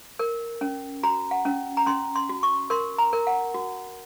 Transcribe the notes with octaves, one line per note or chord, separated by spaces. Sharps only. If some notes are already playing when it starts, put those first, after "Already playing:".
A#4
C#4
F#4 A#5
F#5
C#4
A#5
C#4 C6
C6
F#4
C#6
A#4 C6
A#5
A#4
F#5
F#4